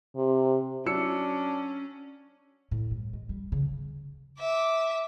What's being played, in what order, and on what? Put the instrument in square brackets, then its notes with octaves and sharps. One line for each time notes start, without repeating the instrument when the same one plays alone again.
[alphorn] C3
[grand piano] F#3 E6 C#7 [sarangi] C#4 [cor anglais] D4
[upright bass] A2
G2
G#3
G3
C#3
[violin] E5 D6